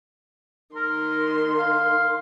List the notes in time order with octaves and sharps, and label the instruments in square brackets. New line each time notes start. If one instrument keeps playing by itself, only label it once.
[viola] D#3 C6 [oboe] A#4
[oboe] F5